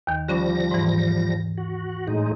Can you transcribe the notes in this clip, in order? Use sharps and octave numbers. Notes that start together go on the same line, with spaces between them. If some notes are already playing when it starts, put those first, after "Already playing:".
D#2 D#3
D3 F3 G3 C#4 D6 A#6
G#2 E3
F#4
A2 G#3 D#4